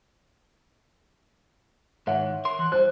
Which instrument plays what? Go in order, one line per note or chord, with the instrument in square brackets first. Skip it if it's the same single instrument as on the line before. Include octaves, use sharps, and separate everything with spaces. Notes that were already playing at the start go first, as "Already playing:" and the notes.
[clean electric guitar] G#2 D#3 [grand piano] C#5 E5 F#5
[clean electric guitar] A#4 C6
[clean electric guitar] E3 [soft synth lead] F#6
[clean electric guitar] G3 [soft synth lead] C5 [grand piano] F#6